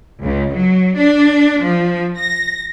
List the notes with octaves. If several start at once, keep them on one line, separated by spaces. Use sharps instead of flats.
C#2
F#3
D4
F3
A#6